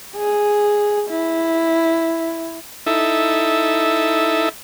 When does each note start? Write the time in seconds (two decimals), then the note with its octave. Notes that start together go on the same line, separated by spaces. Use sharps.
0.16 G#4
1.10 E4
2.86 D#4 E4 A4 E5